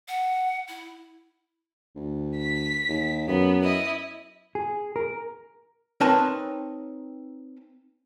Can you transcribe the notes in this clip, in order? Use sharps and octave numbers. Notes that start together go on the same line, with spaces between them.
F#5
E4
D2
B6
D#2
F#2 B3
E4 D#5
G#4
A#4
C4 D#4 A#4 B4 C#5 A5